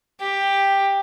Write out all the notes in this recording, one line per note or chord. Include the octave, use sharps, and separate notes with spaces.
G4